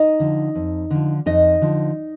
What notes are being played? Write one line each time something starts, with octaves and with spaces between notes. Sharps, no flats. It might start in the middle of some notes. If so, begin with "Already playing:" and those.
Already playing: D#4 D#5
D3 F3
F2
D3 F3
F2 D#4 D#5
D3 F3